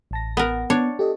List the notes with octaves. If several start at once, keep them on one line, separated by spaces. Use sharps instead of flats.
A1 A5 A#6
B3 A#4
B3 D4 C#5
G4 A4 D#5